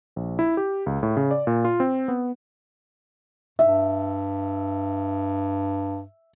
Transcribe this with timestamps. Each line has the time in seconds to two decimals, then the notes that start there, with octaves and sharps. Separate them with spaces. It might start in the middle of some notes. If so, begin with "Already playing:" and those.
0.16 A#1
0.39 E4
0.57 G4
0.86 C#2
1.03 A2
1.17 C#3
1.31 D5
1.47 A#2
1.65 F4
1.80 C4
2.08 B3
3.59 G2 E5